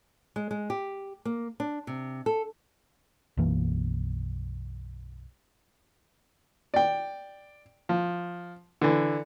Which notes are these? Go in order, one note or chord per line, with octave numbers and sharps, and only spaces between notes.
G#3
G#3
G4
A#3
D4
C3
A4
B1 F#2 E3 A#3
D5 G5
F3
D3 E3